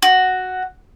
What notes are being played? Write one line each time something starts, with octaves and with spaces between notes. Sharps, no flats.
F#4